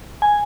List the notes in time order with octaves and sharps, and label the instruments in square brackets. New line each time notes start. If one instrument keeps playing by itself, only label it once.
[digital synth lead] G#5